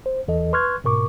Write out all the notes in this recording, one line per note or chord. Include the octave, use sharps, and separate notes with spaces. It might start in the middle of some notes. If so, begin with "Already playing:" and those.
C5
E2 E3 A4 D#5
B4 C6 C#6 F6 F#6 G#6
G#2 B2 A#4 C#6 D6